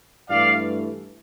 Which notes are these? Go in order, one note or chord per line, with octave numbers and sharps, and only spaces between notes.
G2 E3 A3 D5 F5